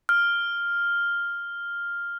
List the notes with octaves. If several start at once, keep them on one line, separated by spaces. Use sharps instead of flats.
F6